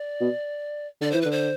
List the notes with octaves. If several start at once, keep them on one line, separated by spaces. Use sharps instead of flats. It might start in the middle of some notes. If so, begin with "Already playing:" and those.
Already playing: D5
B2
D3 D5
E3 C5
D3 B4
C5